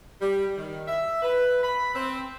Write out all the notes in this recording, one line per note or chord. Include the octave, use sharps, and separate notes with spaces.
G3
D#3
E5
B4
B5
C4